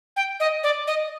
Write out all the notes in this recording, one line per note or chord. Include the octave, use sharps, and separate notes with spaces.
G5
D#5
D5
D#5